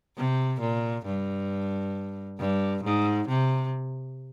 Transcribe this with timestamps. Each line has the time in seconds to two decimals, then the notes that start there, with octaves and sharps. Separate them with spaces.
0.16 C3
0.60 A#2
1.06 G2
2.39 G2
2.84 G#2
3.28 C3